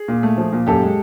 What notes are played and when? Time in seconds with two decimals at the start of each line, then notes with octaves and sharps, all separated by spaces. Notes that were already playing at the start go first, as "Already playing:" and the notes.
Already playing: G#4
0.08 A#2
0.23 A3
0.38 F3
0.52 A#2
0.67 F#2 G4 A4
0.82 G#3